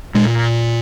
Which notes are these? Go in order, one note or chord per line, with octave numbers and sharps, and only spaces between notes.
A#2 G#3